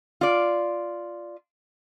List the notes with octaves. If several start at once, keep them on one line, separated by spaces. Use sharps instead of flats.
F4 D5